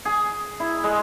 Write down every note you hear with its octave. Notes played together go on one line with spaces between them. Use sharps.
G#4
E4
G#3